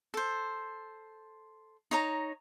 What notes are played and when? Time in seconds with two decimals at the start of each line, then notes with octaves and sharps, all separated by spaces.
0.14 A4 C5
1.91 D#4 C#5 A#5